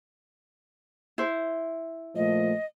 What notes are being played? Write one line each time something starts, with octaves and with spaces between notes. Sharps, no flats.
E4 C5
A#2 F3 A3 D#5